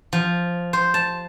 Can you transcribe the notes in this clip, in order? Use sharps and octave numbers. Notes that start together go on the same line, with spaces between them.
F3
C5
A5